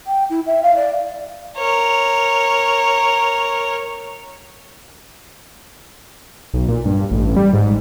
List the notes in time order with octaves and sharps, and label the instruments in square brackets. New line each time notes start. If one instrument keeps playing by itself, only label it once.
[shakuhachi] G5
E4
E5
F5
D5
[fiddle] A#4 C#5
[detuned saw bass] B1
A#2
G2
A1
G3
G#2